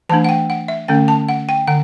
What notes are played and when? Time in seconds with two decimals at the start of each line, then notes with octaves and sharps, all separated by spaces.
0.09 E3 A3 D4 A5
0.24 F#5
0.29 G5
0.50 F#5
0.68 E5
0.88 D3 A3 C#4 G5
1.08 A5
1.29 F#5
1.49 G5
1.68 D3 F#5